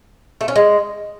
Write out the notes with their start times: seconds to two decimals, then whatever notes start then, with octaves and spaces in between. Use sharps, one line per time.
0.41 A3
0.48 C#4
0.56 G#3